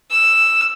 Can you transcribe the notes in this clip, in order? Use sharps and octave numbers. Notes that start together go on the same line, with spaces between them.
E6